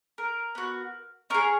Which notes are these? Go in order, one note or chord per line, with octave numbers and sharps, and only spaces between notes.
A#4
B3 F#4
C#4 G#4 A#4